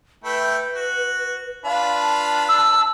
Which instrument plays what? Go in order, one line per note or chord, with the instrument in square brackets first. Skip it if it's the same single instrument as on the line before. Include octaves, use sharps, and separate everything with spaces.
[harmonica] A3 E4 G5 [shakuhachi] B4
[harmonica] F#4
[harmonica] D4 F4 B4 [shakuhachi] F5
[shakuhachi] A5
[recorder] E6